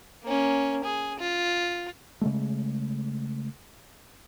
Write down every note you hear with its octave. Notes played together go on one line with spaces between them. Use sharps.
A#3 C#4
G#4
F4
C#3 G#3 A3